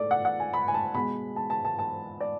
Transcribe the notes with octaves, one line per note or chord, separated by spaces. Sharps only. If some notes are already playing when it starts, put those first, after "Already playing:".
Already playing: A2 G#3 A4 D5
F#5
F#5
G#5
B5
G#5
A5
B2 G#3 B5
A5
A5
A5
A5
D5